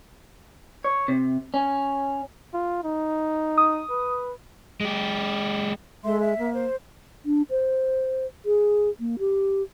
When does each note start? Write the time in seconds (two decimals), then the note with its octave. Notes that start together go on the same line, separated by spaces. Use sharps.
0.84 C#5
1.08 C3
1.54 C#4
2.54 F4
2.84 D#4
3.58 D#6
3.90 B4
4.81 G#3 G4
6.04 G#3 A4 E5 C6
6.20 E5
6.39 A#3
6.53 C5
7.25 D4
7.50 C5
8.45 G#4
9.00 A#3
9.19 G4